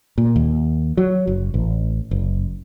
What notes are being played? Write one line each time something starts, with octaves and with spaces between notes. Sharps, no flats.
A#2
D#2
F#3
F#1
A1
F#1